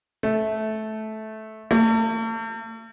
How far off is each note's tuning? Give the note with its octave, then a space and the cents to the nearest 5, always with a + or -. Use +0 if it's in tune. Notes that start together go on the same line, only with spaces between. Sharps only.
A3 -15
A3 +40